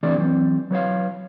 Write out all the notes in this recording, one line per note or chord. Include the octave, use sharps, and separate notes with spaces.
E3 A3 C4 D4 G#4 D5
E3 F#3 C4
F#3 B4 C#5 F5